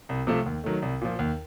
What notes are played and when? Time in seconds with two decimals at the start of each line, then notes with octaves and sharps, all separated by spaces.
0.09 C2
0.27 C3 F3 A3
0.46 D#2
0.64 D#3 F#3 A3
0.82 C2
1.01 A#2 F3
1.19 D#2